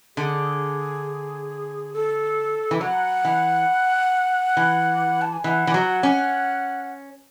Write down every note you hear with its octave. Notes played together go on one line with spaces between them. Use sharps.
D3 G#4
A4
E3
F#3 F#5
E3
E3
A5
G#5
E3 F#5
E3
F#3
C#4